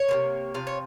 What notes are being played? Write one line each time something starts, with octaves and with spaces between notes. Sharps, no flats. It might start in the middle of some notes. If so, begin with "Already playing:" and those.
Already playing: C#5
C3 F3 A#3
C3 F3 F5
C#5